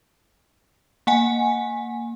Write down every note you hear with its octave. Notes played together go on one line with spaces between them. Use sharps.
A#3 F#5 G#5